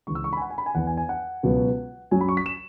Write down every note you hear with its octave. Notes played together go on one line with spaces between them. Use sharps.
C#2 C#3 E3 G#3 C#6
E6
C#6
B5
G#5
F#5
G#5
B5
G#5
E2 E3 B3 F#5
G#5
G#5
F#5
C#2 B2 F#3 B3
F#2 F#3 C#4 G#5
B5
C#6
B6
E7